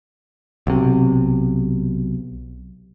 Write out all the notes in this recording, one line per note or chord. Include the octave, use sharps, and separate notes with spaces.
B1 C3